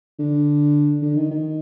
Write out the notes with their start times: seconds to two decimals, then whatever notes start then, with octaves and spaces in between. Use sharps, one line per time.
0.19 D3
1.03 D3
1.16 D#3
1.31 D#3